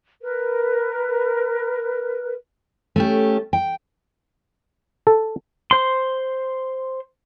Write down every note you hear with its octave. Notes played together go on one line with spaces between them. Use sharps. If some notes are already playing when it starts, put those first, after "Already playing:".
A#4 B4
A3 C#4 G4
G5
A4
C5 C6